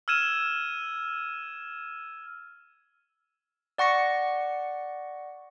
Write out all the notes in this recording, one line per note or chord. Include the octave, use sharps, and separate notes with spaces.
E6 F6 G#6 D#7 E7
D5 F#5 C#6 A#6 C#7